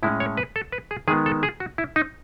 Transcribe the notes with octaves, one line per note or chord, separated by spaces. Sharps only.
A2 G#3 C#4 E4
C#5
B4
A4
B4
G#4
D#3 G#3 B3 G#4
A4
G#4
F#4
E4
D#4